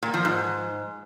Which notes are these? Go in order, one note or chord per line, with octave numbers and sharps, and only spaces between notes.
A#2
F3
G#2